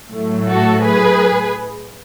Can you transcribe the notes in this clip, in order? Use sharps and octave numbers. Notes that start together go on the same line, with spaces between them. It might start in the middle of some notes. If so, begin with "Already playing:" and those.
A2 F#3 A3
F#4 A4
G#4 B4